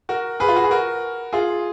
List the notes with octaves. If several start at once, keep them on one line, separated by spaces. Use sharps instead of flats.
F#4 A#4
G#4 B4
F4
F#4
G#4
F#4 A#4
F4 G#4